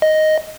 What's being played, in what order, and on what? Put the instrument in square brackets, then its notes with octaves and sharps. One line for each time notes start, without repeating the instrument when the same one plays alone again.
[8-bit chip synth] D#5